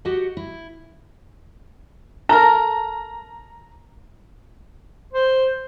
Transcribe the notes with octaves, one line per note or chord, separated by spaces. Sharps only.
F#4 G4 D#5 F#5
E4
A4 A#4 A#5
C5